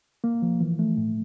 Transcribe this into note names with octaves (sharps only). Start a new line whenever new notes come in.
A#3
F3
E3
A3
A2